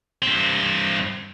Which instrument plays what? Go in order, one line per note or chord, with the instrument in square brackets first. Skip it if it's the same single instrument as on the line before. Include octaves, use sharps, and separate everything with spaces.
[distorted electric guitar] G2 C4